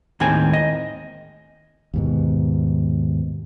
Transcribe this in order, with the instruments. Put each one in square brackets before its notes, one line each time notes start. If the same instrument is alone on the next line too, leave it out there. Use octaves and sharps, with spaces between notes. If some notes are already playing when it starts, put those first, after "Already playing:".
[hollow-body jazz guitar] D#2 A2 D#3 G#3 C4 G#5
D#5
[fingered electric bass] D#2 G#2 B2